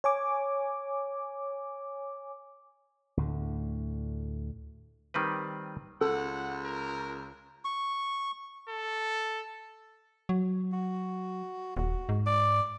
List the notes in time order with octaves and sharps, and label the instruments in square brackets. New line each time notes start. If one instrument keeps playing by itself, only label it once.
[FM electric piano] C#5 G#5 D6
[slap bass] D2 A2 D3
[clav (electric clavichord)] D#3 G3 C4 B4
[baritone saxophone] C#2 [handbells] A4 [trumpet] F#5
[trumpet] A#4
[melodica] C#6
[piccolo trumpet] A4
[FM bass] F#3
[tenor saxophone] F#4
[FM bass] D#1 [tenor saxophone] F#4
[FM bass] G#2
[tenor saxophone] D5